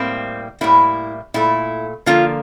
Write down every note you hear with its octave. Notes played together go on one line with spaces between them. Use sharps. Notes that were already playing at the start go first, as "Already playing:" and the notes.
Already playing: A2 G3 A#3 C4
A2 G3 A#3 E4
A#2 A3 E4
D3 F3 A#3 F4